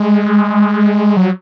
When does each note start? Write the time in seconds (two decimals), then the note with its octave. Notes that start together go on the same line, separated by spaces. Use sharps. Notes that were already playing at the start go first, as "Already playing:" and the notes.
Already playing: G#3
1.17 F#3